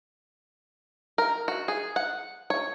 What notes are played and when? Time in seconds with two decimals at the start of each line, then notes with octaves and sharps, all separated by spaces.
1.18 A#4
1.48 F#4
1.68 G#4
1.96 F#5
2.50 C#5